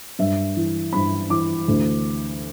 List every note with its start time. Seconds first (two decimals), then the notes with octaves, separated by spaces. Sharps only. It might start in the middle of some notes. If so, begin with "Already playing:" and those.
0.19 G2 E5
0.56 E3
0.93 G2 B5
1.30 E3 D6
1.68 D2